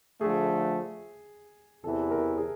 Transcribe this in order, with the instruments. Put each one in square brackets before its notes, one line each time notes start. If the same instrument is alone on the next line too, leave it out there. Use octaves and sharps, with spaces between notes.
[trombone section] D3 F3 A3 [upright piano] G#4
[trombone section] E2 C3 E3 [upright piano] A4
[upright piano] A#4
G#4